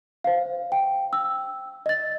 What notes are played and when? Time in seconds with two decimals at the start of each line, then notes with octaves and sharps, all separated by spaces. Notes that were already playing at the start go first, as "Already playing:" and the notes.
0.24 C5 F5
0.72 G5
1.13 E6
1.86 D#5 A6